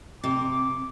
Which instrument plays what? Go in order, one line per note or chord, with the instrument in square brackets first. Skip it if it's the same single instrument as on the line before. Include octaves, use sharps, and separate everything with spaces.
[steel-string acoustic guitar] C3 [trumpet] D6